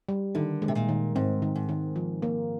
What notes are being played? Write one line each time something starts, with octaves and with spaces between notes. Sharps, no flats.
G3
D3 D#3
G#3
C3
A#2
D#3
G#2 C4
D#3
G#2
D#3
F3
A#3